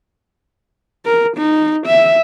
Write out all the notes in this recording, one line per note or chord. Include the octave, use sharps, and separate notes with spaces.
A#4
D#4
E5